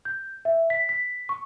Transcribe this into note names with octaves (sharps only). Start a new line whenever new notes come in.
G6
E5
B6
B6
C#6